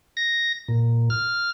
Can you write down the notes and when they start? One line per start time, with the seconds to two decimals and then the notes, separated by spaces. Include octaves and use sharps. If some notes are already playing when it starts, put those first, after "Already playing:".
0.17 A#6
0.68 A#2
1.10 F6